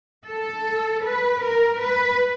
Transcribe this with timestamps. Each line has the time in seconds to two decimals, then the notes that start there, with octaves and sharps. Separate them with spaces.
0.28 A4
1.05 B4
1.43 A#4
1.81 B4